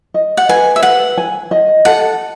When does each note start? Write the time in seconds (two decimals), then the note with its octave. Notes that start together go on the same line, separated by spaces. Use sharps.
0.14 D#5
0.37 F#5
0.49 B4 G#5
0.76 E5
0.83 B4 F#5
1.18 G#5
1.51 D#5
1.85 A4 F#5